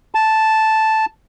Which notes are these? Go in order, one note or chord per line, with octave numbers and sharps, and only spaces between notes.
A5